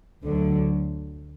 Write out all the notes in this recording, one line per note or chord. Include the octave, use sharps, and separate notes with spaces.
D2 D3 F#3